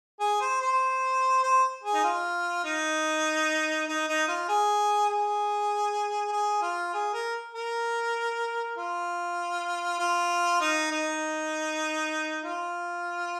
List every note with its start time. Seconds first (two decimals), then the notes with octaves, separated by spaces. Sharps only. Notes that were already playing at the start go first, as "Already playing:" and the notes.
0.20 G#4
0.41 C5
0.62 C5
1.43 C5
1.84 G#4
1.94 D#4
2.04 F4
2.65 D#4
3.88 D#4
4.08 D#4
4.28 F4
4.49 G#4
5.09 G#4
6.33 G#4
6.62 F4
6.94 G#4
7.14 A#4
7.55 A#4
8.77 F4
9.99 F4
10.61 D#4
10.91 D#4
12.44 F4